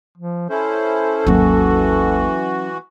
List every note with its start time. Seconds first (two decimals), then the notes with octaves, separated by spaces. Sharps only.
0.17 F3
0.50 C#4 E4 A4 C5
1.27 G#1 D#2 E3 F#3 A#3 C#4 F#4